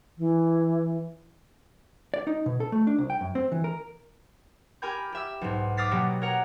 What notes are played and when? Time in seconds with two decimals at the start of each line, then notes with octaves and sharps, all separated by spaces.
0.18 E3
2.14 D5
2.27 D#4
2.46 B2
2.60 A4
2.72 A3
2.87 D4
2.98 C2
3.10 G5
3.21 F#2
3.35 C4
3.52 E3
3.64 A#4
4.82 G4 A#4 G#5 B5 G6
5.12 G4 E5 E6
5.41 B1 G#2
5.77 D6 D#6 F6 A6 B6 C7
5.91 B2 F#3 A#3 F#4 G4
6.22 A#4 C#5 F#5 A#5